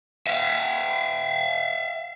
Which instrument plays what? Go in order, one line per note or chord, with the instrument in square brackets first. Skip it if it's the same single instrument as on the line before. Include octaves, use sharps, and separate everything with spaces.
[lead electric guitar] E5 F5